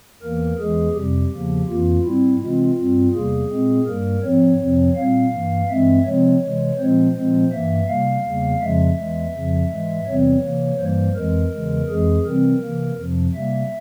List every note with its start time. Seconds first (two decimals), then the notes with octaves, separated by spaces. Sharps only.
0.22 E2 E3 A#3 A#4
0.59 E2 E3 G#3 G#4
0.95 F2 C3 G3 G4
1.32 E2 C#3 F3 A#3
1.68 F2 E3 A#3 F4
2.04 G#2 G3 C4 E4
2.41 C3 E3 G#3 C4 F4
2.77 G2 G3 C4
3.14 E2 C3 G3 A#3 G#4
3.51 A#2 G#3 C4
3.87 G2 G3 A#3 A#4
4.24 G#2 F3 C4 C#5
4.60 F2 C3 F3 C4
4.96 A#2 G3 C4 F5
5.33 G2 E3 A#3
5.69 G2 E3 G#3 C4 E5
6.06 C3 F3 G#3 C4 C#5
6.42 C3 E3 G#3
6.78 A#2 F3 G#3 C4 C5
7.15 A#2 F3 G#3 C4
7.52 G2 E3 A#3 E5
7.88 C3 G3 A#3 F5
8.24 E2 C#3 G3 A#3
8.61 F2 C#3 F3 G#3 E5
8.97 E2 E3 G#3
9.34 F2 C#3 F3
9.70 G#2 E3 G#3
10.07 E2 C3 E3 G3 C4 C#5
10.42 C3 E3 A#3
10.79 G2 E3 G3 A#3 C5
11.16 F2 E3 G#3 A#4
11.52 E2 C#3 E3 G#3
11.88 F2 E3 G#3 G#4
12.25 C3 E3 G3 C4 A#4
12.62 C3 E3 A#3
12.98 F2 C3 F3
13.34 C3 G3 A#3 E5